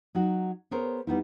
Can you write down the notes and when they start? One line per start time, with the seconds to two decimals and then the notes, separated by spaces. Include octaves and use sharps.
0.15 F#3 D#4 F#4
0.71 B3 G#4 A#4 C5 C#5
1.07 G3 B3 D#4 E4